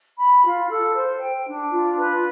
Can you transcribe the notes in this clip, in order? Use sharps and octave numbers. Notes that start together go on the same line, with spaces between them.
B5
F4
A4
C5
G5
D4
F4
B4